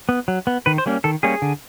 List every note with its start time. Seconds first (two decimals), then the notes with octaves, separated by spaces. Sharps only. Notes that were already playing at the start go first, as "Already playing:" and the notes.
0.09 B3
0.28 F#3
0.47 B3
0.66 D#3 B4
0.78 C5
0.86 G3 A#3 C#4
1.04 D#3 A4
1.23 G3 A#3 C#4 G#4
1.42 D3